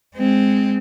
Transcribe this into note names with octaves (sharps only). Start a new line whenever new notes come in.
G#3 C4